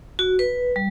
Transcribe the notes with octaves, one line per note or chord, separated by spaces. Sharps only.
F#4
B4
G3